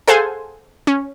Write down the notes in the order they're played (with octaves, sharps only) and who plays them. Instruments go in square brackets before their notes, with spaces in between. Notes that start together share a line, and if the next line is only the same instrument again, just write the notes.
[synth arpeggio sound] G#4 A4 C5 F5 F#5 G#5
C#4